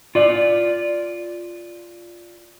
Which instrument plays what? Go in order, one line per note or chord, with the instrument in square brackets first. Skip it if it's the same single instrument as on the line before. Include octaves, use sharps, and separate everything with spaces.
[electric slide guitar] F4 D5